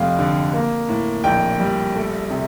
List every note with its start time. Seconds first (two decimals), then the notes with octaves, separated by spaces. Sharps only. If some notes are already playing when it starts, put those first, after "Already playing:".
Already playing: F1 F2 A3 F5 G5
0.19 D3
0.54 A#3
0.89 A2
1.24 A#1 G5
1.60 G3
1.95 A3
2.31 C3